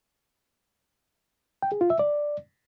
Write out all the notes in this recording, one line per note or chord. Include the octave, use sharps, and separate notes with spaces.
G5
G#4
F4
E5
D5